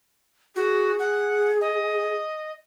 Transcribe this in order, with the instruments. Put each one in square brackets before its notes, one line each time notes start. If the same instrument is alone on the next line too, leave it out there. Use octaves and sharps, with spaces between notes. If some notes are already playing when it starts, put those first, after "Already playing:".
[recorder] F#4 [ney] G#4
[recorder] F#5
D#5